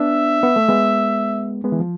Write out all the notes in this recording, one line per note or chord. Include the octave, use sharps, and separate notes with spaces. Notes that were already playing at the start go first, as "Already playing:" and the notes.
Already playing: B3 D4 E5
B3
A3
G#3 B3
G#3 B3
E3
F3